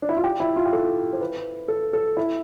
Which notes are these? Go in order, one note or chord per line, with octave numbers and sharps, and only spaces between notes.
D4
E4
F4
G4
E4
F4
G4
A4
C5
B4
A4
A4
E4